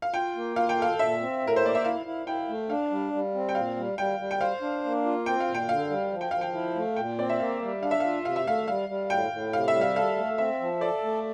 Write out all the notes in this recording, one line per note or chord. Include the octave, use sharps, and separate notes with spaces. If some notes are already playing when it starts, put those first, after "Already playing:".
F5
F4 G5
A#3
F4 F5
G5
A4 F5
A#2 E5
C4
A2
A#4
C5
A#3 D5
E5
E4 F5
E4
E4 G5
A3
D4 F5
G3
G3
C4
G5
A#2 F5
G3
G3 G5
G3
G5
C5 F5
D4
A#3
F4
C4 G5
F5
A#2
G5
D3 F5
G3
F3
G5
F3 F5
G5
E4
A3
A#2 G5
C4 D5
E5
A#3 F5
G3
D4 F5
E5
F4 F5
C3 F5
E5
A3 F5
G3 F5
G3
A2 G5
A2
C3 F5
E5
G3
F5
A4 F5
A3
C4 E5
F3
A4 D5
A3